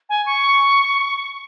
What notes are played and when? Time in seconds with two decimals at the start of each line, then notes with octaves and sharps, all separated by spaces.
0.09 G#5
0.26 C#6